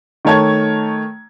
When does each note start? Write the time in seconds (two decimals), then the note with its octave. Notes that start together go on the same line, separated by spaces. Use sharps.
0.25 D#3 A3 C#5 A5 G#6